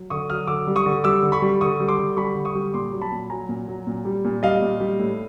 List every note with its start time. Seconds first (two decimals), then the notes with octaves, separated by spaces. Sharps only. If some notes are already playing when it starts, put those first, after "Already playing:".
Already playing: F#3
0.10 D3 C#6 D#6
0.29 F#3 D#6 F6
0.47 D3 D6 E6
0.67 G3
0.76 C#6 D#6
0.86 D3
1.04 G3 D6 E6
1.23 D3
1.32 B5 C#6
1.42 G3
1.61 D3 C#6 D#6
1.80 G3
1.88 C6 D6
1.99 D3
2.17 G3 B5 C#6
2.35 D3
2.45 C#6 D#6
2.55 G3
2.74 A#2 C6 D6
2.92 F#3
3.02 A5 B5
3.12 A#2
3.30 F#3 G#5 A#5
3.49 A#2
3.68 F#3
3.87 A#2
4.05 G3
4.25 A#2
4.43 G3 D#5 F5
4.62 A#2
4.80 G3
4.99 A2